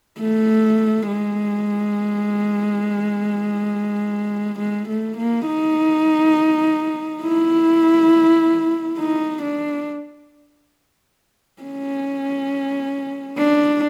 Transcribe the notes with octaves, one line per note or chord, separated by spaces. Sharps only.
A3
G#3
G#3
A3
A#3
D#4
E4
D#4
D4
C#4
D4